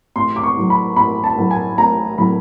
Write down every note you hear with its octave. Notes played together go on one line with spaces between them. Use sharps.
A1 C6
D6
C#6
A2 F#3
B5
A1 B5
A5
A2 F#3
G#5
A1 A#5
A2 F#3 B5